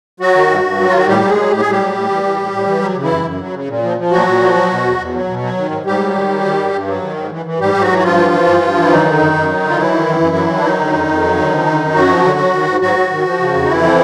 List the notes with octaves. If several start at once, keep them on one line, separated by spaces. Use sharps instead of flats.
F#3 F#4
D#3
G2
G2
F#3
F4
D#3 F#4
A2 G3 G4
F#3
G#3 G#4
F#3
A2 G4
A2 G#4
G3 G4
F#3
A2
E3
E3
A2
A2
E3
F#3
C#3
E3 E4
F#2
F#2
F#3
C#3
A#2
F3
F3
A#2 F#3 F#4
A#2
F3
F#3
B2
E2
E2
F#3
B2
F#3
D#3
G#2
G#2 G3 G4
F#3
D#3
F#3
D#3
G2
G2
F#3
D#3
G#2
E3
E3
G#2 G3 G4
G#2
F#3 F#4
E3
F#4
G2 F3 F4
E3
E3
G2
G2
E3 E4
D#3 F#3 D#4
D3
F#2
F#2
F#3
D3
F4
E3 F#3 E4
D#3
F#2
F#2
F#3
D#3
D4
D#3 F#3 D#4
D3
F2
F2
F#3
D3
F3
D3
F#2
F#2 F#3 F#4
F3
D3
F#3
D#3
G#2
G#2 F#3 F#4
F#3
D#3
F3
C#3
F2
D#4
F2 E3 E4
F3